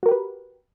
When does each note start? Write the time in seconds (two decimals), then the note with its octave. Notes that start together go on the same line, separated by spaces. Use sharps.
0.03 F#4
0.06 A#4
0.09 G4
0.11 B4